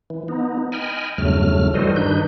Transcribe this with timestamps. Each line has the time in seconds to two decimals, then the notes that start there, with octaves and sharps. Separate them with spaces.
0.10 E3
0.28 B3 D#4
0.72 D#5 G5 G#5 B5 F6
1.18 E2 G2 C#3 F#3 A3 F6
1.74 E3 G3 F#4 A4 C5 D#5
1.96 G2 D#3 D4 D#4 B4 G6